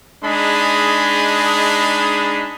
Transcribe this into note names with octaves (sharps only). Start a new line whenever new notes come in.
G#3 D4 D#4 G#4 D#5 B5